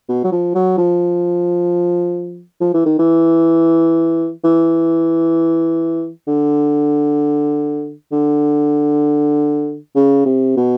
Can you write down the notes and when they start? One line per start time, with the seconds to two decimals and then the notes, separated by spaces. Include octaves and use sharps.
0.09 B2
0.24 F#3
0.32 F3
0.55 F#3
0.78 F3
2.61 F3
2.74 E3
2.86 D#3
2.99 E3
4.44 E3
6.28 D3
8.12 D3
9.95 C#3
10.26 C3
10.57 B2